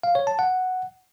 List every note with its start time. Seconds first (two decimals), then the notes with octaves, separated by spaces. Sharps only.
0.03 F5
0.15 C#5
0.27 A5
0.39 F#5